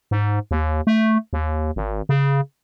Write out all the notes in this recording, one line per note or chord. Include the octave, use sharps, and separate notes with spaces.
G#2
D#2
A3
D#2
G#1
C#3